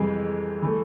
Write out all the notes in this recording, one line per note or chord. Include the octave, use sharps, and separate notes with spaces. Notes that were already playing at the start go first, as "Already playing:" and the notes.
Already playing: F2 C3 E3 G3 G#3
E3 A3